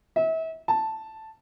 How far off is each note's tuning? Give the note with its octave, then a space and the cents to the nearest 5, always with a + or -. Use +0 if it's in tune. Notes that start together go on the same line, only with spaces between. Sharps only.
E5 -35
A5 +0